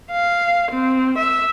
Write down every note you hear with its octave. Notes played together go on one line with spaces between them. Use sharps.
F5
C4
E5